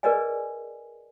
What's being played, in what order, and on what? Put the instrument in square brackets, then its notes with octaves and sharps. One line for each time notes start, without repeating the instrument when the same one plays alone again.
[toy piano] G#4 A#4 B4 D5 D#5 G#5